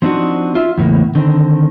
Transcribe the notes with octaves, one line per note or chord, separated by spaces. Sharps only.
F3 C4 D4 D#4 F#4
F4 E5
E2 A2 C#3 A#3
D3 D#3 C4